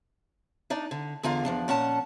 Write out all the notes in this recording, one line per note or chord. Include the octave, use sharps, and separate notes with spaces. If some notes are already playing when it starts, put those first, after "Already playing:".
D4 D#4 D5
D3
E2 D3 F4 G#4 F5 A#5
E2 F3 D4
A#2 C#4 F#5 A5